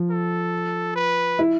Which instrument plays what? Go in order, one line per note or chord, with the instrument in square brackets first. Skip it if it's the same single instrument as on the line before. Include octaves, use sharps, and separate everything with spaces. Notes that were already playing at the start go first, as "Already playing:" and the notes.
Already playing: [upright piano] F3
[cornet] A4
B4
[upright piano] E4